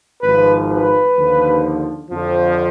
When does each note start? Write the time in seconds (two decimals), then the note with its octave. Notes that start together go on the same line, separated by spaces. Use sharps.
0.21 G#1 G#2 F3 B4
0.69 B4
1.16 D#2 D3 F3
2.10 F2 D3 F3